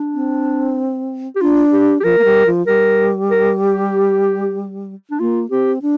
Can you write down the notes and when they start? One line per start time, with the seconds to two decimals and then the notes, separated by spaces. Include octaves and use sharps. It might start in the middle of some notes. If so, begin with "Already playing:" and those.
Already playing: D4
0.14 C4
1.36 G4
1.41 D4 F4
1.72 G4
2.00 G4
2.04 F3 A#4
2.18 A#3
2.25 G3
2.46 F3
2.67 G3 A#4
3.30 A#4
3.62 G4
5.11 D4
5.20 A#3 F4
5.50 C4 G4
5.82 D4